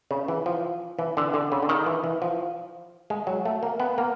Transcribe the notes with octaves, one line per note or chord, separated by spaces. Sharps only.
C#3
E3
F3
E3
D3
D3
C#3
D3
D#3
E3
E3
F3
G#3
F#3
A3
A#3
B3
A#3